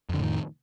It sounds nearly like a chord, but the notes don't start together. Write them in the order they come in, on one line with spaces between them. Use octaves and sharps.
F2 D3 A2 D#3